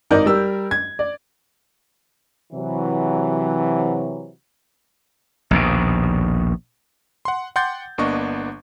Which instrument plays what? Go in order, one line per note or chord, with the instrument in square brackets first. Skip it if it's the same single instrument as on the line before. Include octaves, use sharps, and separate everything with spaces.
[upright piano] G#1 D#4 A#4 D5 G6
G3 A#4 E6
G#6
D5
[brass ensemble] C3 E3 F#3
[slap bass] A#1 D#2 B2
[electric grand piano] F#5 C6
F#5 G5 C6 D6 G6 A6
G1 A#3 B3 D4 D#5 C#6